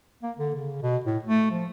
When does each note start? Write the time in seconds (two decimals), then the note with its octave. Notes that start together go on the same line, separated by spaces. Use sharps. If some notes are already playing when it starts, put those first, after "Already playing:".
0.23 A#3
0.38 D3
0.55 C#3
0.83 B2
1.06 A2
1.24 A3
1.51 F3